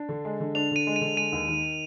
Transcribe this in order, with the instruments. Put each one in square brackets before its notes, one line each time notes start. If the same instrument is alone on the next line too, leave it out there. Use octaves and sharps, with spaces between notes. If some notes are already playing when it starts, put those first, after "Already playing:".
Already playing: [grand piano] D4
D3
G#3
D3
[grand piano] D4 [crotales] F7
[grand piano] D3 [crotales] D#7
[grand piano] G#3
[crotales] D#7
[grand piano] D3
[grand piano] G#3 [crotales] D#7
[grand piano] D#2
D#3